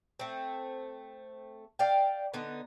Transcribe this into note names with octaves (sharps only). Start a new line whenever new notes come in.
A3 C4
D5 F5 G5
D3 B3 D#4